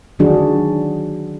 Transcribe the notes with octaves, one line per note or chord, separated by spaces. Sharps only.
D3 D#3 F#3 D4 F#4 G#4